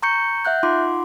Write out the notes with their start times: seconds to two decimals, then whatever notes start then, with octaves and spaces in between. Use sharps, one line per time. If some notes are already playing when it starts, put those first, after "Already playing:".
0.03 A#5 C#6 G6 C#7
0.45 E5 F#5 F#6 G6
0.63 D#4 F4 F#5 C6 D6